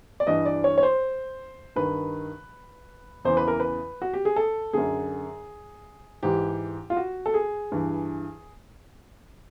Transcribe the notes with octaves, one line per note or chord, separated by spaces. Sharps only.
D5
G2 E3 D#5
D5
C#5
C#5
C5
G2 D#3 B4
E2 C#3 E3 C5
B4
A#4
B4
F#4
G4
G#4
A4
F#2 D3 G#4
G#2 E3 G4
F4
F#4
A4
G#4
G2 E3